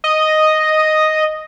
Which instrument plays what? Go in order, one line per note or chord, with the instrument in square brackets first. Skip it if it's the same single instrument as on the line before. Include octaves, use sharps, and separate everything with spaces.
[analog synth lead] D#5